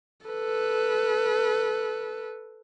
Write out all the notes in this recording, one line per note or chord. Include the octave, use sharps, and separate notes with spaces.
A4 B4